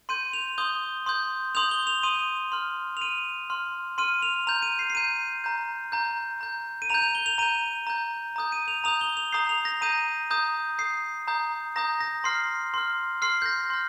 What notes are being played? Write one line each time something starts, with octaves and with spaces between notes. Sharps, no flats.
C6 G6 D#7
F7
C6 D#6 G6 G7
C6 D#6 G6
C6 D#6 G6 F7
G7
F7
C6 D#6 G6 D#7
C6 F6
F7
C6 F6 D#7
C6 F6
C6 F6 D#7
F7
A#5 G6 F7
D#7
C7
C7
A#5 G6 D#7
A#5 G6
A#5 G6
A#5 G6
D#7
A#5 G6 F7
F7
G7
F7
A#5 G6 D#7
A#5 G6
A#5 D#6 G6
D#7
F7
A#5 D#6 G6 F7
G7
F7
A#5 D#6 G6 C7
F7
A#6
A#5 D#6 G6 D#7
A#5 D#6 G6
A#5 D#6 G6 C7
A#5 D#6 G6
A#5 D#6 G6 A#6
A#6
C6 F6 C7
C6 F6
C6 F6 C7
G6
A#6
C6 F6